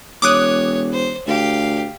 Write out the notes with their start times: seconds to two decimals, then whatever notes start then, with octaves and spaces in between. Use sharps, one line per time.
0.22 E1 C#5 D6 D#6 F#6
0.92 C5
1.27 D2 G4 F5